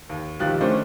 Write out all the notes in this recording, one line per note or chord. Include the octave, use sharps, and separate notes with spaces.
D#2
B1 D#3 F3 G3 F#6 A6
D#3 A3 C#4 D4 C5